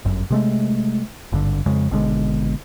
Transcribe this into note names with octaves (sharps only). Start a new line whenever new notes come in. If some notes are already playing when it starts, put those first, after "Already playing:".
G1 F#2
C3 G#3 A3
G#1 G2 D3
F2 C#3 G#3
G#1 B2 D3 G#3